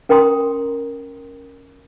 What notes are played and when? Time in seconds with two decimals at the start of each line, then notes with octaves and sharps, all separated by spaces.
0.09 C#4 A#4 G5 A#5 C6 D#6